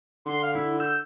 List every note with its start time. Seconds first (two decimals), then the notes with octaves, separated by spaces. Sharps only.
0.26 D3 C6
0.42 F5
0.55 E4 E6
0.80 E6 G6